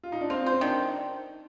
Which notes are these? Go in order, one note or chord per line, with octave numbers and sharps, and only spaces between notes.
F4
D#4
D4
C4 F4
C5
C4
D#3 D4